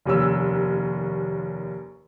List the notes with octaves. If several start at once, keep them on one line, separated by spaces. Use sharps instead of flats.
F1 D#2 C#4 E6